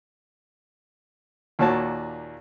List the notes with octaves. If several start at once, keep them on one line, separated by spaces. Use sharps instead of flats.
D#2 A#2 F#4 C#5 A5